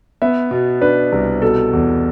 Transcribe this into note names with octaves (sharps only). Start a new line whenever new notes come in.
B3 E5
B2
D4 B4
C2
B2 A4
E2